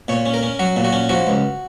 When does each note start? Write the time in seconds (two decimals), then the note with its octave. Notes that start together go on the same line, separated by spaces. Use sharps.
0.08 A#2 C#5
0.26 C#4
0.34 A#4
0.43 C#4
0.59 F#3 F#4
0.76 A#2
0.85 F#4
0.92 C#4
1.09 F3 F#4
1.27 C#2